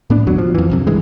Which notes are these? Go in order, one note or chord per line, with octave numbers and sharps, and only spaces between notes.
A2 B3 D4
F#1 D#2 F#3
F3
F2 E3
D#1 F#2 C3
C2 G2 E3 G#3